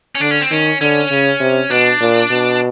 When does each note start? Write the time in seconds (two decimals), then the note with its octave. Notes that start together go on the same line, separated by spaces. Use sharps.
0.15 C#4
0.21 D3 D4
0.31 C#4
0.41 C4
0.51 D#3 C#4
0.81 D3 C#4
1.11 C#3
1.40 C3
1.70 B2 D4
2.01 A#2
2.30 B2